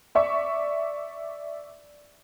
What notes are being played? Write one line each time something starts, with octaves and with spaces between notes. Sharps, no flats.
D5 E5 C#6